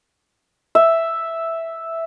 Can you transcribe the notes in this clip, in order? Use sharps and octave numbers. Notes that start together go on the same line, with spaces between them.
E5